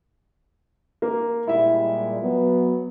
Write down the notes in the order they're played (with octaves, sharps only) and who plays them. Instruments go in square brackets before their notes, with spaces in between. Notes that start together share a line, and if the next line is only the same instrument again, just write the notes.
[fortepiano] A#3
[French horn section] A#2 G3 G#3 [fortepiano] E4 E5
[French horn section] F#3 B3